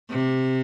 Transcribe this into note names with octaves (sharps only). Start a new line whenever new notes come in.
C3